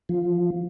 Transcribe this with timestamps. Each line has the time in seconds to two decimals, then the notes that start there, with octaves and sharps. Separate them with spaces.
0.09 F3